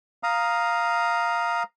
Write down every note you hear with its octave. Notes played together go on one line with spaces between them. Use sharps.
F5 A#5 D#6